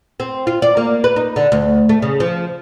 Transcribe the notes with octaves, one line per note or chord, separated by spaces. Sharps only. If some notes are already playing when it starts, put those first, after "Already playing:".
C4
F4
D5
A#3
B4
D#4
D3
D2
A3
C#3
F3